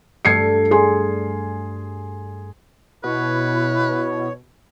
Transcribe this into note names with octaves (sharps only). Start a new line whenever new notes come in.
G2 G3 A3 G#6 C7 C#7
G#4 G#5 C6
B2 E4 B4 C#5